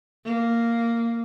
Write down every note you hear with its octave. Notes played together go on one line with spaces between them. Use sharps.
A#3